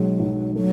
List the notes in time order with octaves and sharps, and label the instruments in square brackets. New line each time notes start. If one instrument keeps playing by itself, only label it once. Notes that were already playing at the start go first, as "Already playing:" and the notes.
Already playing: [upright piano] B1 B2 G#3 [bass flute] F#3
[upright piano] B1
[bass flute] F#3 [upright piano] A3